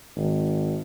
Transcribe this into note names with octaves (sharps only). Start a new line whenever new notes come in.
G#1